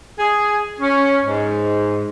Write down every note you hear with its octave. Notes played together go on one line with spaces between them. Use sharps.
G#4
C#4
G#2